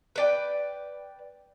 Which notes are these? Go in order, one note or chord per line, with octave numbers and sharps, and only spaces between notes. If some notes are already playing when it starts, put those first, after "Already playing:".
B4 D5 G5